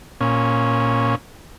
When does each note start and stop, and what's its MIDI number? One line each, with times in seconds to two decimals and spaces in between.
0.21 1.15 46
0.21 1.15 61